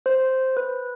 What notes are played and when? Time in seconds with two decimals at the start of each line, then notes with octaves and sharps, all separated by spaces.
0.06 C5
0.57 B4